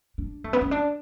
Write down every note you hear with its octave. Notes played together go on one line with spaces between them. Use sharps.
D4
A3
B3
C#4
D4